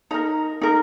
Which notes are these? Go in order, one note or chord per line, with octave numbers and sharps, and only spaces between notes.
D#4 A#4 A#5
D#4 A#4